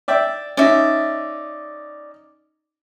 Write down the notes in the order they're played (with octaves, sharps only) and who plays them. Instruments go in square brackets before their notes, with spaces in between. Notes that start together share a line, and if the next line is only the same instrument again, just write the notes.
[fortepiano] D5 E5 G5
[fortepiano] C#4 D#4 [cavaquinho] D5 E5